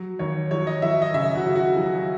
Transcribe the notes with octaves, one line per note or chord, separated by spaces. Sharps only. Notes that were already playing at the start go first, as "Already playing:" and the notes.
Already playing: F#3
D#2 C#5
F#3 C#5
D#5
F#3 E5
D#5
C#3 E5
F#4
C#3
F#4
F#3